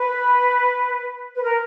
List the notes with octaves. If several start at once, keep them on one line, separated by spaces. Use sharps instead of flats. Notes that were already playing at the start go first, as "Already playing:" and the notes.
Already playing: B4
B4
A#4